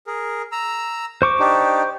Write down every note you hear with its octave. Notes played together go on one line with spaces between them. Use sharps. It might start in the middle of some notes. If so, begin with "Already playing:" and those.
G#4 A#4
A#5 E6
C5 C#6 D6
D4 D#4 G4